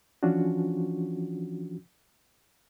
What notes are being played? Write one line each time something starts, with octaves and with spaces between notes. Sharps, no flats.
E3 F3 C#4 D4 F4 F#4